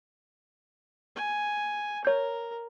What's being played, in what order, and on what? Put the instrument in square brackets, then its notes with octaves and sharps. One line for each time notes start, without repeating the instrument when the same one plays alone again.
[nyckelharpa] G#5
[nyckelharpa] A#4 [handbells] C#5 G6